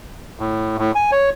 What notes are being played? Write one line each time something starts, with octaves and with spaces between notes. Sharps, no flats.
A2
A2
G#5
C#5